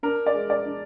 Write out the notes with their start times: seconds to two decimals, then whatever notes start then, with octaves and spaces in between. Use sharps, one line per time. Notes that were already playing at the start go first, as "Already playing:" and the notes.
0.03 D4 A#4
0.26 D5
0.34 G#3
0.50 D5
0.65 D4